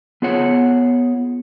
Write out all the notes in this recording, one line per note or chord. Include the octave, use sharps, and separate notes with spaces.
B3 F4 G#4 C#5 F#5